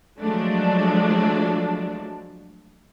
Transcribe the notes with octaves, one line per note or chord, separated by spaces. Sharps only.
F3 F#3 G#3 A3 D4